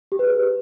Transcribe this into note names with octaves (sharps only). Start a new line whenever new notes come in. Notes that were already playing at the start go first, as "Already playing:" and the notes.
G4
B4
G#4